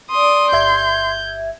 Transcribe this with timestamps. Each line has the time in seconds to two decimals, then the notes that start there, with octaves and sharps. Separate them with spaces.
0.11 D5 C6 D#6
0.52 G1 E5 G6 G#6